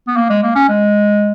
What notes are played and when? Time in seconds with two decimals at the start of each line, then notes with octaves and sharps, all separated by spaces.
0.07 B3
0.17 A#3
0.30 G#3
0.43 A#3
0.55 C#4
0.69 G#3